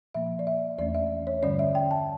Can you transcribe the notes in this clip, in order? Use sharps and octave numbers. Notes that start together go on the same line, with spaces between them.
A#2 F3 A#3 E5
D5
E5
E2 E3 A3 C#4 D5
E5
C#5
G2 D3 G3 C#4 D5
E5
G5
A5